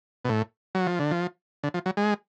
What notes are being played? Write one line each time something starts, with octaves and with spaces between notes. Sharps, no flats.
B2
A2
F#3
F3
D3
F3
D3
F3
F#3
G#3